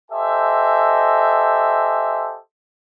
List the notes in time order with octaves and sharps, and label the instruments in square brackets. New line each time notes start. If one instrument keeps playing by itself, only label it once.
[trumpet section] G4 A4 C5 D#5 E5 G#5